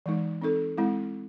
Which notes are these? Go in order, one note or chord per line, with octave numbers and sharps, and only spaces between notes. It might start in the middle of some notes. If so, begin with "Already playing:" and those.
E3 G#3 D#4
C4 D#4 A4
G#3 C4 E4